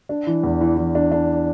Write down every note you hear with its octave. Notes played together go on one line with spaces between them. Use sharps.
D4
E3
E2
E3
E3
D4
D4